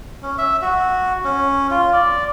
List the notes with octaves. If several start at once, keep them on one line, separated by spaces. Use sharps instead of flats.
C#4
E5
F#4
C#4
F4
D5